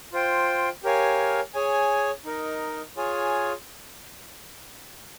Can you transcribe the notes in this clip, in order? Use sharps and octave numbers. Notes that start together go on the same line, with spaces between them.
F4 C5 G5
G4 A#4 C#5 F5 G#5
G#4 C#5 G#5
D#4 A#4 D#5
F4 G#4 C#5 G#5